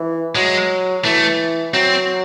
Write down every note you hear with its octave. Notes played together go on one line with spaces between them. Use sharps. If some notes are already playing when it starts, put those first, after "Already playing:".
Already playing: E3
F#3 G#3
E3 A3
F#3 C4